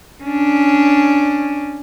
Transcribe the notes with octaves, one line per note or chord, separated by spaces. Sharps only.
C#4 D4